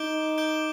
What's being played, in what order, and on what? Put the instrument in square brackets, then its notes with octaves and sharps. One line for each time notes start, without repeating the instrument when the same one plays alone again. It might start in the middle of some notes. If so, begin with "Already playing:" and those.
Already playing: [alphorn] D#4 [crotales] D6 G6 D7 G7
[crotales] D6 G6 D7 G7